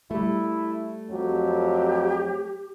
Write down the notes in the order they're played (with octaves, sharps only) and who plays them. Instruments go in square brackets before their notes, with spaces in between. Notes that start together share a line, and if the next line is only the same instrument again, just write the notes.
[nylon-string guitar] G3 A3 [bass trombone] E4
[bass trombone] F2 [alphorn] F#3 [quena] G4